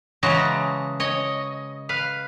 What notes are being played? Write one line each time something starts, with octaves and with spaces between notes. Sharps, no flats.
C#3 E3 G#3 F#4 A5 A#5
C#5 D#5
B4 F5